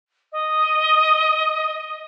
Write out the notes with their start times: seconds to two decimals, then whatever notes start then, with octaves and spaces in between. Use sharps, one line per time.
0.32 D#5
1.75 D#5